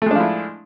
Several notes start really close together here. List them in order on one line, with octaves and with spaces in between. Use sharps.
A3 G#3 D4 F3 E4